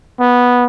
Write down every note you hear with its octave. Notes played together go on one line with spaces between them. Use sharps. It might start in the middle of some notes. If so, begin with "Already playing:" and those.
B3